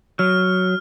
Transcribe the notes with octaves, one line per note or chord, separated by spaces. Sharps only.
F#3 F6